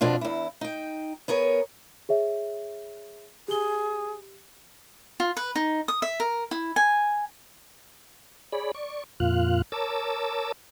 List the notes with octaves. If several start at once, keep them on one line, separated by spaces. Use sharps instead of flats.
F2 B2 D4 F4
E2 E4
D#4 G5
B3 G#4 A#4 C#5
G#4 C#5 E5
G4 G#4 G7
F4
B4
D#4
D#6
E5
A#4
E4
G#5
G#4 C#5 D5 B5
D5 C#6
F2 A#2 F4 F5 F#6
A#4 C#5 A5 D6 E6